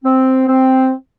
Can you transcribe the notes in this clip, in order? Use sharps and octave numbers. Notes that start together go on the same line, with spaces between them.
C4
C4